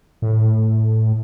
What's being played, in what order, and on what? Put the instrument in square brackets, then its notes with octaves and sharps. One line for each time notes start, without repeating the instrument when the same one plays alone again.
[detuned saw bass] A2